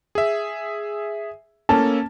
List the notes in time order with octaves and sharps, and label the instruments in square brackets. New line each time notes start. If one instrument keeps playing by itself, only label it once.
[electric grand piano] G#4 E5
[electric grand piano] A#3 C#4 A4 [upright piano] A5